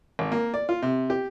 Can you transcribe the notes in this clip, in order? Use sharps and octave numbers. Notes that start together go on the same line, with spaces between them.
G#1
A#3
D5
F4
C3
G4